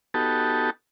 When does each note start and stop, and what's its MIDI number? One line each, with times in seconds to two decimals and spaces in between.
0.14 0.70 59
0.14 0.70 63
0.14 0.70 66
0.14 0.70 67
0.14 0.70 69
0.14 0.70 81